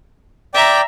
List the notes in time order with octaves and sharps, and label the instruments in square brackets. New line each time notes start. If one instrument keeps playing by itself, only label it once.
[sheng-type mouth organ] D5 G5 D6 [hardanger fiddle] E5 A#5